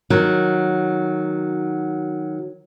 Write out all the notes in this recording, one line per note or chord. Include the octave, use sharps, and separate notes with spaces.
D#3 F#3